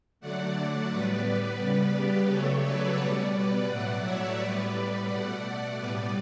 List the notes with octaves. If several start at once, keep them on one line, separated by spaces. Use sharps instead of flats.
D3 F#3 A3 D5 F#5
D5 F#5
A2 G3 B3 B4 D5
B4 D5
C#3 G3 B3 B4 D5
G4 B4
C#3 F#3 A3 A4 C#5
B4 D5
B2 G3 B3 D5 F#5
B4 D5
A2 F#3 A3 D5 F#5
C#5 E5
A2 G3 B3 B4 D5
B4 D5
B2 A3 D5 F#5
A2 G3 B3 B4 D5